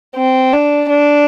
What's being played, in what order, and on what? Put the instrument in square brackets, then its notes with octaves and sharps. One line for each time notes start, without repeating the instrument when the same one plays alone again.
[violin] C4
D4
D4